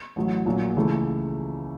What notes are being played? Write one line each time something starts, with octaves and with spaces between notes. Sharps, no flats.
A1 A2 F#3
A#1 A#2 F#3 A#3
C#2 C#3 E3 A3